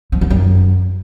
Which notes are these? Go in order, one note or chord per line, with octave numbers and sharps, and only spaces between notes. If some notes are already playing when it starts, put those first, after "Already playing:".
F3
D#3
F#2